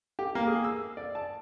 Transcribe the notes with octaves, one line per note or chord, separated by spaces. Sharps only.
G4
A#3
G#4
E6
D5
A5